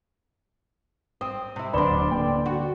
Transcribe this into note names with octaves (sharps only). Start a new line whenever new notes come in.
C4 D#6
C3 E4
D1 B3 D4 D5 B5 C6 E7 G7
D3 A#3 G5
F#4